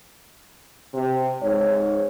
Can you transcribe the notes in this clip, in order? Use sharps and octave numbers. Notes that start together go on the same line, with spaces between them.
C3
G#2 C#5